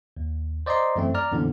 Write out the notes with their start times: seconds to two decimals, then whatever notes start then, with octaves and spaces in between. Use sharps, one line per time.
0.17 D#2
0.66 C5 D5 D#5 A#5 C6
0.96 F#2 E3 A3 C4
1.14 D5 A#5 F6
1.32 F2 A#2 D3 E3 F3 B3